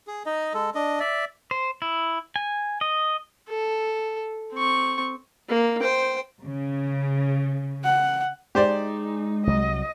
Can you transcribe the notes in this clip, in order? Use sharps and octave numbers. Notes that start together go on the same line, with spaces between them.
G#4
D#4 D#5
G#3 A4
D4 D#5
D5 E5
C5
E4
G#5
D#5
A4
C4 C#6
A#3
C5 G5
C#3
F#5
G#3 D#4 G4 C5 D5
C2 F#3 D#5